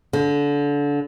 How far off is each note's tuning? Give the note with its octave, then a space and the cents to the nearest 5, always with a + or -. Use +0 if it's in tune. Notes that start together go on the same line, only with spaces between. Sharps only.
D3 -25